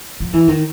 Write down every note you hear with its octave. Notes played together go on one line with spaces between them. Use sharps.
F3
E3
D#3